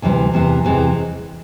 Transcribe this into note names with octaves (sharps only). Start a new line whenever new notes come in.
D2 C3 E3 G3
E2 C3 E3
E2 C3 E3 G#3 C4